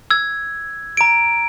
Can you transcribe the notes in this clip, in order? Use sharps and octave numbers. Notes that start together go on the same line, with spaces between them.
E6 G#6
A#5 D7